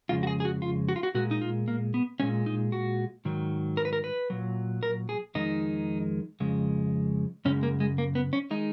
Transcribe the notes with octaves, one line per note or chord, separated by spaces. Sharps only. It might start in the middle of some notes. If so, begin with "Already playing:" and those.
F2 C#3 G#3 F4
F#4
G#4
G#4
F#4
F4
F#4
F4
F#4
A#2 G#3 F#4
D#4
F4
A#3
B3
A#2 G#3 C#4
D#4
F#4
G#2 D#3 F#3
A#4
B4
A#4
B4
A#2 F#3
A#4
G#4
F2 D#3 G#3 D#4
F2 C#3 G#3
F#2 C#3 G#3 C#4
A#3
G#3
A#3
B3
C#4
D#3 G#3 D#4